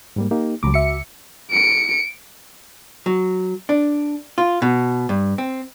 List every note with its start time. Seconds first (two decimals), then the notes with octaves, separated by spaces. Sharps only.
0.16 G#2 G3 A#3
0.31 A#3 D#4 G4
0.63 C#2 F#3 A3 D6
0.74 F#4 E5 C#7
1.51 C#7 D7
3.06 F#3
3.69 D4
4.38 F4
4.62 B2
5.09 G2
5.38 C4